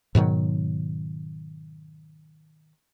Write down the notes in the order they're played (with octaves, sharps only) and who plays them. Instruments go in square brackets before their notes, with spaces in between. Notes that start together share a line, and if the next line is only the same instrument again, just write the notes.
[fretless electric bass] G#2 B2 D#3 F#3